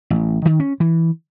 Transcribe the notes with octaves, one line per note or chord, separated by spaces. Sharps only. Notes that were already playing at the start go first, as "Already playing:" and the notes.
A1
D#3
C#4
E3